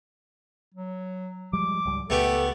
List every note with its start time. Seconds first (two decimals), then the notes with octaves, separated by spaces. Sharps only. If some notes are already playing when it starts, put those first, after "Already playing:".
0.74 F#3
1.53 F3 G3 G#3 D6
1.85 C#2 G#2 G3
2.10 C#2 A3 B3 G4 A4